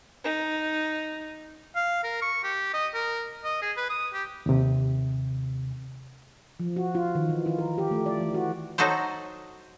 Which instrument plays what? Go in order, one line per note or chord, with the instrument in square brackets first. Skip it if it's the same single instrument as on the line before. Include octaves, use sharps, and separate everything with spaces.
[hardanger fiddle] D#4
[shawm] F5
A#4
C#6
G4
D#5
A#4
D#5
G#4
B4
D#6
G4
[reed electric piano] D#2 C3
[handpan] F3
F#4
F4
D#3
E3
F4
A#4
G4
A3
D5
E3
F#4
[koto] F#3 D#4 F#4 A4 C5